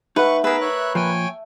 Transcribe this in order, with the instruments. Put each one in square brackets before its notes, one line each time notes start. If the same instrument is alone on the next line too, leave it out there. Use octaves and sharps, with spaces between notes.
[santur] A3 [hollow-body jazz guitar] D#4 F#5 [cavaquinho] B4 [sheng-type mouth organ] C#6
[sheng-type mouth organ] B3 G#4 E6 [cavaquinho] A#4 B4
[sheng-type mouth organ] C#5 E5 F#6
[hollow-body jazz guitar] A#2 F3 [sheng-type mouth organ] C#5 G5 G#5